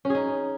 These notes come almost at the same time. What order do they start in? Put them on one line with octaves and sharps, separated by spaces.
C#4 G#4 D#4